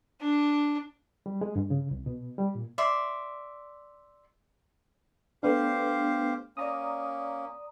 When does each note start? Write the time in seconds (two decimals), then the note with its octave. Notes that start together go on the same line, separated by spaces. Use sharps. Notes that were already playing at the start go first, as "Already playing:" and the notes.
0.21 D4
1.26 G3
1.41 G#3
1.56 G2
1.70 C#3
1.91 C2
2.06 B2
2.38 G3
2.55 A#2
2.78 D5 E5 C6
5.43 A3 B3 D4 G4 C5 F5
6.57 A#3 C#4 D5 A#5 D#6